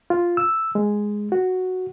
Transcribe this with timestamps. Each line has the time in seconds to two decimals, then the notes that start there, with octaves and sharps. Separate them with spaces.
0.10 F4
0.37 E6
0.75 G#3
1.32 F#4